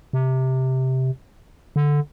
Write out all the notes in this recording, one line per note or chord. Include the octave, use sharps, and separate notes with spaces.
C3
D3